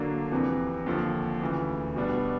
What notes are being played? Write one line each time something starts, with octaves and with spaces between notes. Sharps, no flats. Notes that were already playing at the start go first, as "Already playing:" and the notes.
Already playing: D3 F#3 A#3 D4
F2 C3 E3
D#2 D3 F3
D2 C#3 E3
B2 G3 B3 D4 F#4